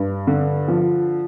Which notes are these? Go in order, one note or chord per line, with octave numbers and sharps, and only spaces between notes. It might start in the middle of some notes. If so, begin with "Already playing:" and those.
Already playing: G2
D3
F3